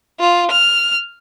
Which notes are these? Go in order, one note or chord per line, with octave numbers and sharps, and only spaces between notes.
F4
F6